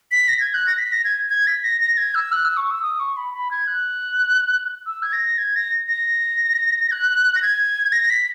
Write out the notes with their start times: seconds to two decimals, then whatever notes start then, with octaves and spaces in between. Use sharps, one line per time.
0.12 B6
0.28 A#6
0.40 G#6
0.54 F#6
0.67 A#6
0.78 B6
0.92 A#6
1.04 G#6
1.29 G#6
1.47 B6
1.64 A#6
1.81 A#6
1.97 G#6
2.15 E6
2.32 F#6
2.45 E6
2.57 C#6
2.71 E6
2.82 D#6
3.00 C#6
3.17 B5
3.34 B5
3.51 G#6
3.67 F#6
4.86 E6
5.02 G#6
5.13 A#6
5.38 G#6
5.56 A#6
5.88 A#6
6.91 F#6
7.35 A#6
7.42 G#6
7.92 A#6
8.10 B6